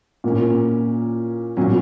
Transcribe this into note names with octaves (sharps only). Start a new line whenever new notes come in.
A#2 A#3 C#4
A#2 F#3 C#4